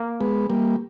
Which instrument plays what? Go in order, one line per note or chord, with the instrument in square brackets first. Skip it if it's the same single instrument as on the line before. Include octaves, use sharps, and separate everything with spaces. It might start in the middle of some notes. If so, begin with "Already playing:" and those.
Already playing: [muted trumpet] A#3
[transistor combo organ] G#3 B3
G3 A#3